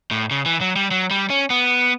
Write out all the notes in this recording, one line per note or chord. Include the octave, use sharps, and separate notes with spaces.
A2
C#3
E3
F#3
G3
F#3
G3
C#4
B3